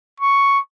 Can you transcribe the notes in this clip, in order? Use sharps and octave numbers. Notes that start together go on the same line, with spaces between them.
C#6